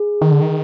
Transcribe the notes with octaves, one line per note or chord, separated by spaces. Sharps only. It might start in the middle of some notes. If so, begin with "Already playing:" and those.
Already playing: G#4
D#3
D3
D#3